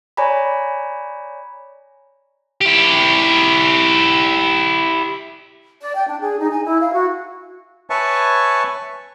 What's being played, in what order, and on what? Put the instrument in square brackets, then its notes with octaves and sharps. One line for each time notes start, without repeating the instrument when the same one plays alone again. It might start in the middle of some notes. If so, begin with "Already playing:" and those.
[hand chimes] C#5 D5 G#5 A#5 B5
[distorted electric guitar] E4 G4
[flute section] D5
G5
D4
G#4
D#4
G#5
E4
F5
F#4
[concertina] B4 C#5 E5 G#5 A5 C#6